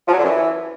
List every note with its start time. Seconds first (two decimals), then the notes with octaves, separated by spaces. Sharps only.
0.07 F3
0.12 F#3
0.18 D3
0.23 F#2
0.28 E3